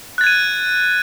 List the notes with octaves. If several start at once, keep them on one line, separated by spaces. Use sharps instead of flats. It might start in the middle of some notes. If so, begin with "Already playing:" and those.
F#6 G#6 A6 D#7